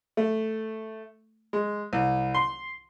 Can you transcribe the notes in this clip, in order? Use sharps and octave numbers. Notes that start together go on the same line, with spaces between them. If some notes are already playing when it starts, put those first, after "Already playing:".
A3
G#3
C2
C6